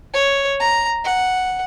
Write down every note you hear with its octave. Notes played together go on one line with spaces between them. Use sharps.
C#5
A#5
F#5